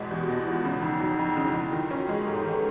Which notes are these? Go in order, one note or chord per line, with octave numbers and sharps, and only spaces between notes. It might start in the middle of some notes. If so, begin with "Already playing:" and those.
Already playing: E2 B2 G#3
E2 G4
F#4
B2
E4
E2 F4
C#3
F2 D#4
F#3 D#4
F2 D#4
C#3
E4
F2
D#3 F4
F4
C#4
F#4
G#3 G#4
G#2 G4 A4
G#4 A#4
D#3
A4 B4